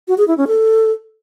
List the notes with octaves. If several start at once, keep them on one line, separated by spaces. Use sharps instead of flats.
F#4
G#4
E4
C#4
A4